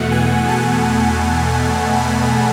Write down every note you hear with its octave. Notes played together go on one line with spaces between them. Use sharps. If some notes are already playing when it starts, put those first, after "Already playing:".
Already playing: E2 B2 A3 F#5
G#5
A5
B5